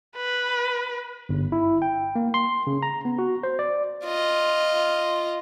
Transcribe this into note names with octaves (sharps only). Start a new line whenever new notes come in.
B4
G1
E4
G5
A#3
C6
C#3
A#5
B3
F#4
C5
D5
F4 D#5